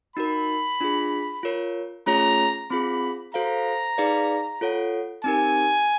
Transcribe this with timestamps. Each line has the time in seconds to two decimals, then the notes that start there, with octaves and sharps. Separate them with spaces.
0.16 D#4 F#4 A#4 B5
0.80 D4 F4 G#4
1.43 F4 A#4 C#5
2.06 A3 C#4 F4 G#4 C#5 A#5
2.70 C4 F4 G#4 B5
3.34 F#4 A4 C5 F5 A#5
3.98 D#4 G#4 B4 D5 F5
4.61 F4 A4 C#5 F#5
5.24 C4 D#4 G4 A#4 G#5